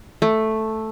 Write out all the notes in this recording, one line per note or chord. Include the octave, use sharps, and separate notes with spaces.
A3